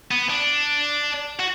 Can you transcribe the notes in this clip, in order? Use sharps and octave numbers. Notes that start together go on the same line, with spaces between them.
B3
D4
F#4